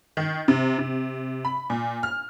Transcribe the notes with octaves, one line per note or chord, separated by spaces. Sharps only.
D#3
C3
C3
B5
A#2
F6